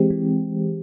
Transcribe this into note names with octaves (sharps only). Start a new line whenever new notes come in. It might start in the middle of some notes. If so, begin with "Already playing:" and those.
Already playing: E3 G#3 C4 G4
E3